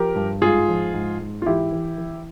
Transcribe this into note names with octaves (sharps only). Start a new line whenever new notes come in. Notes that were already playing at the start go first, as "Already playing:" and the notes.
Already playing: F3 G4 A#4
G2
G#2 F4 G#4
F3
G#2
G#2
F4
E3 E4 G4
E3
E3